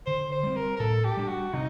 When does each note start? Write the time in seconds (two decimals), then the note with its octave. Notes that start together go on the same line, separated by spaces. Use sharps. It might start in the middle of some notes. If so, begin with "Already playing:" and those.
0.06 D3 C5
0.32 C5
0.43 G3 C4
0.56 A#4
0.76 A#4
0.80 A2 A4
1.05 G4
1.17 G3 D4
1.28 F#4
1.53 C3 D#4